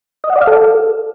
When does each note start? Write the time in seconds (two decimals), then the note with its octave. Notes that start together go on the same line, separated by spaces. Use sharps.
0.24 D#5
0.30 F#5
0.36 D5
0.41 F5
0.47 A4